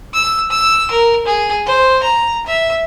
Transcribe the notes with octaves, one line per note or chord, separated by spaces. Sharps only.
E6
E6
A#4
G#4
C5
A#5
E5